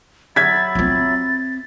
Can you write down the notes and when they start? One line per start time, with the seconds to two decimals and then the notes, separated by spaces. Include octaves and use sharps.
0.36 F#3 E5 B5 G#6 A6 B6
0.75 C4 F4